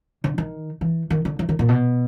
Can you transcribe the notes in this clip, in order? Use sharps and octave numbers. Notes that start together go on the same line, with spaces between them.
D3
D#3
E3
D#3
D3
E3
D#3
A#2
B2